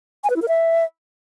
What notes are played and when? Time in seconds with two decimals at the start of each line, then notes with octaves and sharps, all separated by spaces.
0.24 G#5
0.30 B4
0.36 E4
0.42 A#4
0.48 E5